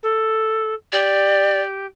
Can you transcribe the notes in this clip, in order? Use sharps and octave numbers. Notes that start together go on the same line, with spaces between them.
A4
G4 D5